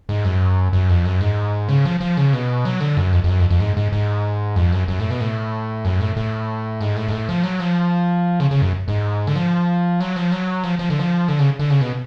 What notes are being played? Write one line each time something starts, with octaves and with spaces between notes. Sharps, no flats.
G#2
F#2
F#2
F2
F#2
G#2
C#3
F3
F3
C#3
B2
F#3
D3
F#2
F2
F2
F#2
F2
F2
G#2
G#2
G#2
F2
F#2
F#2
A2
B2
A2
F#2
A2
A2
G#2
A2
G#2
A2
F3
F#3
F3
C#3
C#3
F#2
G#2
D3
F3
F#3
F3
F#3
F3
F3
D3
F3
D3
C#3
D3
C#3
B2